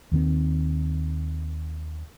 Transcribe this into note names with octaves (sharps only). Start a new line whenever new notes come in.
D#2 D#3 C4